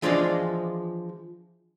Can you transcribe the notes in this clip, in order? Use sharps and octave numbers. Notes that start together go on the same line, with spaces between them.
E3 F3 G#3 D4 F4 D5